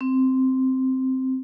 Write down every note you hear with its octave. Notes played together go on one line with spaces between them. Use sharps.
C4